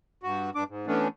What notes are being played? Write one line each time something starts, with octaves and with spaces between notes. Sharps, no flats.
G2 F#4
G2 D4 D6
G#2
E3 A3 B3 C#4 D4